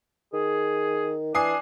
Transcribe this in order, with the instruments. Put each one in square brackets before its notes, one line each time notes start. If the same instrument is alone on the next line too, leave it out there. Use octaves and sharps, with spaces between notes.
[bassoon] D#3 [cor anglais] G#4
[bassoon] E3 [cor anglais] D4 [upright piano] G#5 D#6 C7